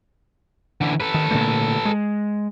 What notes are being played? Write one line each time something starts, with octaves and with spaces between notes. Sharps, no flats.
D3 E3
A4 B4
D#3
A#2 D3 A3
G#3